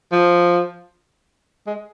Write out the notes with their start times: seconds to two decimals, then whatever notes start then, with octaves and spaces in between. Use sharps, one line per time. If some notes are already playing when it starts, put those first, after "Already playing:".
0.12 F3
1.67 G#3